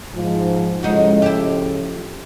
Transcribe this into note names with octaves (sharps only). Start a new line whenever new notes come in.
G#2 F3
A2 C#3 F3 G#3 D#4 F#4
E4 G4